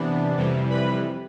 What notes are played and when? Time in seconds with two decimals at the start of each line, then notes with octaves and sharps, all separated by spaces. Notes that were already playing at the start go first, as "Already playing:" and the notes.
Already playing: C3 E3 B3 D4
0.37 F2 C3 E3 G3
0.70 B4 B5